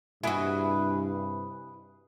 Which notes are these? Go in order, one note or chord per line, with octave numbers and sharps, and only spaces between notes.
G2 C3 E4 F#4 G#4 B4 D#5